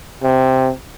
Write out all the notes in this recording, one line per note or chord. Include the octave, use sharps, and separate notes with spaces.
C3